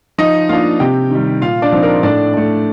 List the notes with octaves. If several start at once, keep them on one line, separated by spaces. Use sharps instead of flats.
F3 D#4 D#5
A#3 D4 F4 F5
C3 G4 G5
D#3 G3
A#2 F4 F5
D4 D5
F3 C4 D#4
A#4
A2 D4 D5
A3 D4